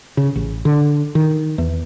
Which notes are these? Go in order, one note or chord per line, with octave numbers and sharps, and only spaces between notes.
C#3
A1
D3
D#3
E2